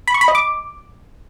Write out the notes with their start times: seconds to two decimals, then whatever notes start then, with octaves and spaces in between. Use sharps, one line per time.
0.08 B5
0.14 C#6
0.21 B5
0.28 D#5
0.35 D6